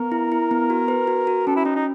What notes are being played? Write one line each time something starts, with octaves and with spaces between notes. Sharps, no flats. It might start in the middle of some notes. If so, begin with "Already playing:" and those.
Already playing: B3 A#4
E4
E4
B3
F#4
B4
F#4
F#4
C#4 A4
E4
C#4 D#4
D#4